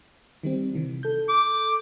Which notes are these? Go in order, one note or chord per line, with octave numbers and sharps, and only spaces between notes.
D#3 G3 C4
C3 D#3 E3
A4 G6
D6